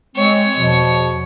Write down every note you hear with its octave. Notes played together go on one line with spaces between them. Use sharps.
G#3 C4 C#5
E2 B2 F3